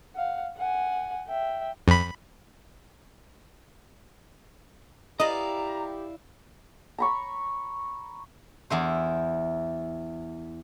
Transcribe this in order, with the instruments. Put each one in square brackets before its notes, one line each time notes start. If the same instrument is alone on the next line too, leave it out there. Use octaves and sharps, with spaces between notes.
[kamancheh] F5 F#5
F#5 G#5
E5 G5
[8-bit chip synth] F2 B5
[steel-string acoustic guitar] E4 D5 F5 [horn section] G4 [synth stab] D#5 [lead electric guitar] A#5
[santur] A#5 B5 C#6
[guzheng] E2 E4 C5